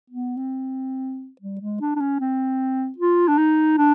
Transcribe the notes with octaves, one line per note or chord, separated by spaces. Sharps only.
B3
C4
G3
G#3
D4
D4
C#4
C4
F4
D4
D#4
D4